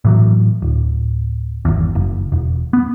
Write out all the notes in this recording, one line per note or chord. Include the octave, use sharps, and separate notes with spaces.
A2 E3 F#3
D1
G#1 E2
F#1
E1
B3